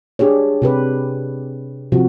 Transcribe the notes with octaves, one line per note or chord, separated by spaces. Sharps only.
D4 G4 G#4 C#5
C3 G4 B4
C3 F3 F#4